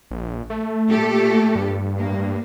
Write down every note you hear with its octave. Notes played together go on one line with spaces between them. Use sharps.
A#1
A3
A#2 G4 A4
G2
A2 A#3